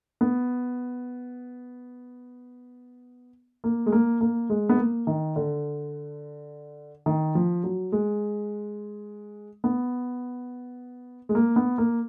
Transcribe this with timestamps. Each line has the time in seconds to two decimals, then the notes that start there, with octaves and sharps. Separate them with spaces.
0.21 B3
3.64 A#3
3.86 G#3
3.92 A#3
4.21 A#3
4.50 G#3
4.69 B3
4.78 A#3
5.07 D#3
5.36 D3
7.06 D#3
7.35 F3
7.64 F#3
7.92 G#3
9.64 B3
11.29 G#3
11.35 A#3
11.56 B3
11.78 A#3